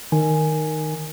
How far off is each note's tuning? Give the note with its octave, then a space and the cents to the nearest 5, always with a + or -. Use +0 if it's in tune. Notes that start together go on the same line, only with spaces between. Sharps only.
D#3 -5 G#5 +0